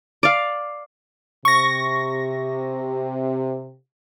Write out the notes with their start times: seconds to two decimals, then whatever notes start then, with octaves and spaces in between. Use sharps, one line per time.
0.23 D5 F5
1.45 C3 C#6 A#6